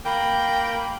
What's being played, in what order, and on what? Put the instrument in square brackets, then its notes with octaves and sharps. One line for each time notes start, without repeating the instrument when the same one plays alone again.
[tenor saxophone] A#3 [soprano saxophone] G5 [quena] B5